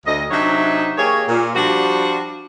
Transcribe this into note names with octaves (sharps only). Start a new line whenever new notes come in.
D2 D#5
C3 F#3 D4 D#4 C#5 E5
D#3 A#3 G4 G#4 C#5
A#2
F3 G3 D4 F4 F#4